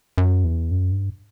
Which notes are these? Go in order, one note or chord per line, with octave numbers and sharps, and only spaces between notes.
F#2
E2
F#2
G2